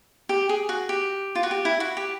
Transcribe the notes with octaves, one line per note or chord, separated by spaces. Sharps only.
G4
G#4
F#4
G4
F4
F#4
G4
E4
F#4
G4